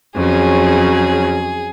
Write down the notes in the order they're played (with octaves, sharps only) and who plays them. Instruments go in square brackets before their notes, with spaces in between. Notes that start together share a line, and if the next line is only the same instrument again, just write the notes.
[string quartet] F2 C#3 F#3 G#4